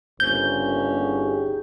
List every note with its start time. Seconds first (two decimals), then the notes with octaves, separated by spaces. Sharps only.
0.20 G1 C#3 A#3 C#4 C5 G6
0.95 D#4 G4 G#4